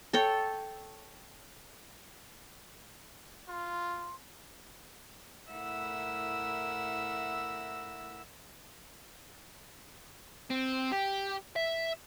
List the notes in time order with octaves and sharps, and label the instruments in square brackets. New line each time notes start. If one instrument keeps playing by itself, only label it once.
[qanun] A4 C#5 G5
[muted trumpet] F4 [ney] C6
[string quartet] A2 E4 A#4 E5 F#5 E6
[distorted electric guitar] C4
G4
E5